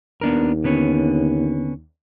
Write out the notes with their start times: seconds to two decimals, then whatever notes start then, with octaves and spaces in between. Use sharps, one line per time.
0.21 D#2 B3 D4 A#4
0.64 D3 B3 C#4